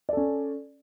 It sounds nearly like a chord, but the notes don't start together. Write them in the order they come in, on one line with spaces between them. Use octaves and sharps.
D5 A4 C#4